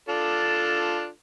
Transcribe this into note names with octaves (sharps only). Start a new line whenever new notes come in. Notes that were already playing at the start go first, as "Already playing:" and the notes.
D4 F4 A4